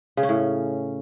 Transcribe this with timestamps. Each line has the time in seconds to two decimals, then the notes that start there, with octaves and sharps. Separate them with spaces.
0.17 C#3
0.23 C#4
0.29 A2